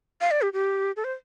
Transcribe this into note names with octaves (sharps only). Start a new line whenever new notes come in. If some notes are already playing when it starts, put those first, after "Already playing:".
F5
D5
G4
G4
A4
C5